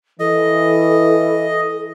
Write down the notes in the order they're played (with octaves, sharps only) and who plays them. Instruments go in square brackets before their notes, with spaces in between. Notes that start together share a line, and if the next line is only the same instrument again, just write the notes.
[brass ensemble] E3 [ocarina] A4 [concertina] D#5